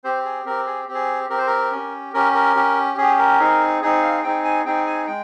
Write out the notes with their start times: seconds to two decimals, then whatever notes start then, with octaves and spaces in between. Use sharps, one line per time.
0.04 C4 G4 C5
0.25 G#4
0.46 C4 G4 A#4
0.67 G#4
0.88 C4 G4
0.95 G#4
1.30 C4 G4 A#4
1.38 C5
1.47 A#4
1.71 C#4 G4
2.14 C#4 G4 A#4
2.35 A#4
2.55 C#4 G4
2.97 C#4 G4 G#4
3.19 A#4
3.40 C4 D#4 G#4
3.82 C4 D#4 G#4
4.02 F5
4.24 C4 D#4 G#4 G5
4.45 G#5
4.65 C4 D#4 G#4 G5
4.87 G#5
5.07 G#3 G5